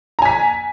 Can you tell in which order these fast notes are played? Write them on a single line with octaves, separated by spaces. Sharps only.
A#5 G#5 B6